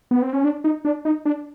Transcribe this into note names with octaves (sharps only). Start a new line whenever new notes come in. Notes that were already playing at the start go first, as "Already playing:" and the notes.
B3
C4
C#4
D4
D#4
D4
D#4
D4